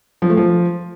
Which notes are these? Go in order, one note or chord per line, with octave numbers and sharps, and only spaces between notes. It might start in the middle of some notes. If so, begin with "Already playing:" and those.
F3
A3
F3